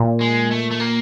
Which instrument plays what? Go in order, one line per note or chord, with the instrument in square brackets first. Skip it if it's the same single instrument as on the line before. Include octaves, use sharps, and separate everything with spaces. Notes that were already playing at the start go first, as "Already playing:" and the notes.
Already playing: [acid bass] A#2
[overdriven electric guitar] G#3
A3
A3
A#3